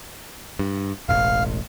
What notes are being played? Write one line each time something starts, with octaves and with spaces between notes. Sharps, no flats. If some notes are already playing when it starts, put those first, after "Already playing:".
G2
E1 A1 F5